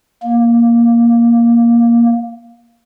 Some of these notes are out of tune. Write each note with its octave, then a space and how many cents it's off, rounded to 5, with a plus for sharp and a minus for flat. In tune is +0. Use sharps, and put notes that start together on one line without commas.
A#3 +10